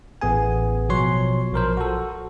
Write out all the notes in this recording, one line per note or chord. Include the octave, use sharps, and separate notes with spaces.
A1 B3 G#4 G#5
B2 F3 F#3 C#5 C6
A#1 F3 A#4 C5
F#4 A4